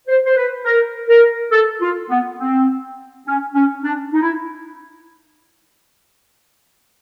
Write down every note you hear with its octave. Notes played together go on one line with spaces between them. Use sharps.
C5
C5
B4
A#4
A#4
A4
F4
B3
C4
C#4
C#4
D4
D#4
E4